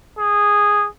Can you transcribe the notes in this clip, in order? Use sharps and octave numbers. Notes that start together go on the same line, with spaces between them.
G#4